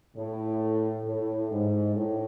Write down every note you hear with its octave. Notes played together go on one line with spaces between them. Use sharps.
A2
A2
G#2
A2